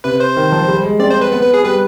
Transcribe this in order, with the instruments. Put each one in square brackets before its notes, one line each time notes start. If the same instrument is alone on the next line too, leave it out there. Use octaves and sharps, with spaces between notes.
[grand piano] C3 [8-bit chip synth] B4
[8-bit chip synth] C5
[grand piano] D#3
F3
G3
G#3
[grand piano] C4 [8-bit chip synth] D5
[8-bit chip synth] C5
B4
[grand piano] B3 [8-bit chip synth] B4
[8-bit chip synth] B4
G#4
[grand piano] G3 [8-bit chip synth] B4